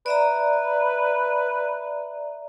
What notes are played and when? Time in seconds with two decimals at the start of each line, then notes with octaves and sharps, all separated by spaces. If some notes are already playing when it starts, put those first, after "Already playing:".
0.06 B4 D5 E5 A#5